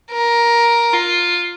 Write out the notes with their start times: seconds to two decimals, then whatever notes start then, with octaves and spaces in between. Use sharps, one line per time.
0.11 A#4
0.94 F4